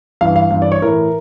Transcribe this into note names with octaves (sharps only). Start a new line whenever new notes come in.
G2 E3 F5
F5
G2 E3 F5
D5
C#5
A2 E3 A#4